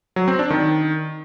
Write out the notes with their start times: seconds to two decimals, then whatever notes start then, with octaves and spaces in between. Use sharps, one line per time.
0.16 F#3
0.28 C4
0.39 D4
0.50 D#3